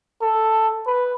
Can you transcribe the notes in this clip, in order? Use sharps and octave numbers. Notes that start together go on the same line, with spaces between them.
A4
B4